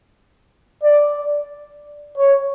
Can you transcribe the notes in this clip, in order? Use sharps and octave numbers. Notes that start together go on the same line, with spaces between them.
D5
C#5